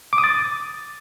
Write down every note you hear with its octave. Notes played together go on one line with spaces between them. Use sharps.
D6
D#6
A6